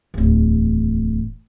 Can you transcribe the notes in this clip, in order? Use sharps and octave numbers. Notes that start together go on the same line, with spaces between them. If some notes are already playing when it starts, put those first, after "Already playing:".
D1 E2